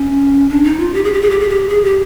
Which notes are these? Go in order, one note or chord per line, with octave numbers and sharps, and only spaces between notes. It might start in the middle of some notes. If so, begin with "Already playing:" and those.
Already playing: C#4
D4
D#4
F4
G4
G#4
G4
G#4
G4
G#4
G4
G#4
G4